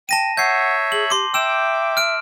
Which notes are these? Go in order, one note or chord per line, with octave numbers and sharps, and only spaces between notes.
G5 A5 A#6 D#7
C#5 E5 F#5 G6 C7
G#4 F#7
G4 C6 D6
E5 G5 D6 E6 E7
F6 D7